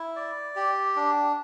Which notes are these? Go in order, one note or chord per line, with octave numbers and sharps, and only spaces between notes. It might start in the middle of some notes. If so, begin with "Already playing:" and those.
Already playing: E4
D5
G4
D4